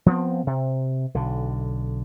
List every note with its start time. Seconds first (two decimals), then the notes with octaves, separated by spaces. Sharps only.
0.06 F3 B3 C4
0.47 C3
1.14 B1 D3